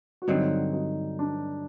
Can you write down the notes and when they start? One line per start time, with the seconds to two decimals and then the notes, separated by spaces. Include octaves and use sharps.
0.22 F#4
0.28 G2 D3 F#3 C4 D#4
0.73 D#4
1.19 D4